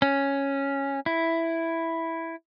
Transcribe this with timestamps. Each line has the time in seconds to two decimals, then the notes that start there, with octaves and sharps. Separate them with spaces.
0.02 C#4
1.06 E4